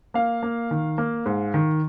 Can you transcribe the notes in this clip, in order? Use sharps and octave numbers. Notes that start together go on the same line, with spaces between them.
A#3 F5
A#3
D#3
A#3
G#2
D#3